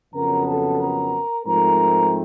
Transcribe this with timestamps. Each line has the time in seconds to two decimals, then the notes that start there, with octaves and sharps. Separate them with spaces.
0.14 F2 C#3 F#3 B3 A#4 A#5
0.46 A4 A5
0.80 A#4 A#5
1.46 G#2 F3 A3 C4 A#4 A#5